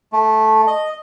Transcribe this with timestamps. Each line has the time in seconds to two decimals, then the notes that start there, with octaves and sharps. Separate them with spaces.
0.13 A3
0.67 D#5